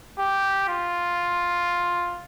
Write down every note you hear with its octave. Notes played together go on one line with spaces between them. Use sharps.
G4
F4